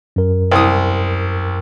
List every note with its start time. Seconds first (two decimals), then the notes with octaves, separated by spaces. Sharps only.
0.16 F#2 A#4
0.52 C2 D#6